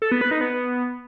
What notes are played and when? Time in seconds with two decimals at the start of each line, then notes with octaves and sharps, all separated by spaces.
0.02 A4
0.12 B3
0.21 B4
0.31 D#4
0.41 B3